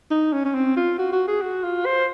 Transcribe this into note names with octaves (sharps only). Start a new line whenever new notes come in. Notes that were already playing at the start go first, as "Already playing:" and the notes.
D#4
C#4
C#4
C4
F4
F#4
F#4
G#4
F#4
F4
C5